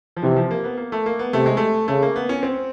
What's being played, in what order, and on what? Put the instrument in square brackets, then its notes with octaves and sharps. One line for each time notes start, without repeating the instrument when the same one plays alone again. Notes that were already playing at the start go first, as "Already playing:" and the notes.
[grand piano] F3
[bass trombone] C3 [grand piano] E3
[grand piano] F3
A#3
B3
A#3
A3
A#3
B3
[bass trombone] C3 [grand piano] A3
[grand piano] G#3
A3
[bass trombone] C#3 [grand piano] A3
[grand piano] A#3
B3
C#4
C4